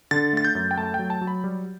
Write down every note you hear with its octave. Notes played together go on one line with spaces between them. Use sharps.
D3 A6
A3 A6
G6
F#2
G5
A3 A5
F#3 G5
A5
F#3
B5
G3